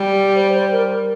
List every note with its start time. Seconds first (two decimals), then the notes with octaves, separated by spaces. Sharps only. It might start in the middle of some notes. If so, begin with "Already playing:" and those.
Already playing: G3
0.35 C5
0.54 C5
0.72 A#4